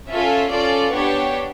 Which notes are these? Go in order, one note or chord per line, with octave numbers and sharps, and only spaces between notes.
C#4 F4 A4 E5
C#4 F4 A4 D5
B3 D4 G4 C#5